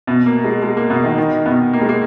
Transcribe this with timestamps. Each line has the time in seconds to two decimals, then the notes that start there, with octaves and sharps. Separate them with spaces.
0.07 B2 B3
0.26 A#3
0.44 G#3
0.62 G#3
0.77 A#3
0.90 B2 B3
1.04 D#3 D#4
1.18 D#3 D#4
1.46 B2 B3
1.73 A#3
1.82 G#3
1.89 A#3